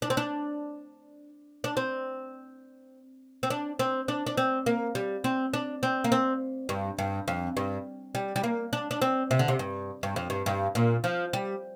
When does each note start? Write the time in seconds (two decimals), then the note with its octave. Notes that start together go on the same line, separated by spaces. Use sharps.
0.02 D4
0.10 C4
0.17 D4
1.64 D4
1.77 C4
3.43 C4
3.50 D4
3.79 C4
4.08 D4
4.27 D4
4.37 C4
4.66 A#3
4.95 G3
5.24 C4
5.54 D4
5.83 C4
6.04 A#3
6.12 C4
6.69 G2
6.98 G2
7.28 F2
7.57 G2
8.15 G3
8.36 G3
8.44 A#3
8.73 D4
8.91 D4
9.02 C4
9.31 C3
9.39 D3
9.48 C3
9.59 G2
10.03 G2
10.16 F2
10.30 G2
10.46 G2
10.75 A#2
11.04 F3
11.33 G3